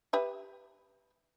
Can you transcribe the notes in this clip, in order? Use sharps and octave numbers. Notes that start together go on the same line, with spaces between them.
G4 B4 E5